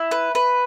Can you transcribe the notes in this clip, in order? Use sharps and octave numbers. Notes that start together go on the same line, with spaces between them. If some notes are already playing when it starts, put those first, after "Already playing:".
Already playing: E4
B4
B4